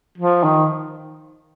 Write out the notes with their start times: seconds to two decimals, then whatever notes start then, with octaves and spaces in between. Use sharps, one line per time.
0.18 F3
0.44 D#3